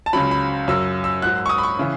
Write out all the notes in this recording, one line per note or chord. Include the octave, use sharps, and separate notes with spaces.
A5
C#2 C#3 F#3 B5
B5
F#2 C#3 F#3 E6
E6
G#2 F#3 F#6
C#6
D#6
B5
C#6
C#3 E3